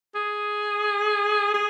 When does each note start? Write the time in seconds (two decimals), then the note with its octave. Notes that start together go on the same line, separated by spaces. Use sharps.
0.15 G#4
1.54 G#4